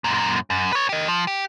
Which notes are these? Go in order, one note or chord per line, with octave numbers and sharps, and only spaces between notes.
F#2 A#2
F#2
B4 C#5
G4 D#5
F3
G4